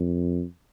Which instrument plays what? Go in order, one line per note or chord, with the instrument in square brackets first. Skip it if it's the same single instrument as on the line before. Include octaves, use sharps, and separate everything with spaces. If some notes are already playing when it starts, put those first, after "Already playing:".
Already playing: [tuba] F2